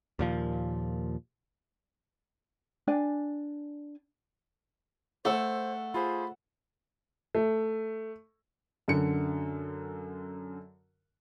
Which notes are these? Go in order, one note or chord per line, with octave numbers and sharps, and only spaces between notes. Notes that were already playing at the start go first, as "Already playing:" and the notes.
D#2 A#2 F3
D4 D5 G#5
A3 C5 F#5 E6
F4 G#4 C5 B5
A3
F#2 D3 C#7